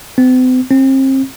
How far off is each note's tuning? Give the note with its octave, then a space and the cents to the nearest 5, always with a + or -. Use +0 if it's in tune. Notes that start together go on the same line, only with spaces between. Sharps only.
C4 -45
C4 +35